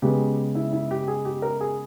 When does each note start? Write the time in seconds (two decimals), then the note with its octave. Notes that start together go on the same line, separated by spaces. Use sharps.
0.02 C#3 G#3 B3 G4
0.55 E4
0.73 E4
0.91 G4
1.08 G#4
1.25 G4
1.42 A#4
1.61 G#4